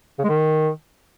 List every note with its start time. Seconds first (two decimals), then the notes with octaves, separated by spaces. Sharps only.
0.19 C#3
0.24 G#3
0.29 D#3